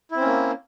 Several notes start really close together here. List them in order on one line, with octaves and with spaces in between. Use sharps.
E4 C4 C#4 A#3